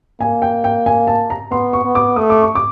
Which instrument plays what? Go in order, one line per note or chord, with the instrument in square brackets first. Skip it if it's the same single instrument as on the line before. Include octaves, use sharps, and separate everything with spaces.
[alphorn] A#3 [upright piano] G#5
[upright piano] G5
G5
G#5
A5
A#5
[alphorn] B3 [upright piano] C6
[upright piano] C#6
[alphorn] B3
[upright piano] D6
[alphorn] A3 [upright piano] D#6
[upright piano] D6
C#6
D6